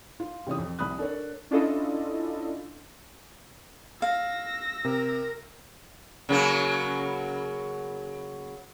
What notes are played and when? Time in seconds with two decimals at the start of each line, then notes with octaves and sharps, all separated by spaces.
0.20 F4
0.47 C3 E3 C#4 C#5 D#6
0.58 F2
0.79 C2 B5 D#6 F#6
0.98 D4 A4 A#4 C#5
1.51 C#4 D4 E4 F4 A4 D#5
4.02 F5 E6 A#6
4.85 C3 A#4
6.29 C#3 F#3 A#3